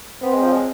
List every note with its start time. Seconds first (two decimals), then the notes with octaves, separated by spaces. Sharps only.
0.22 B3 C4
0.33 G#3
0.42 F3
0.52 G#3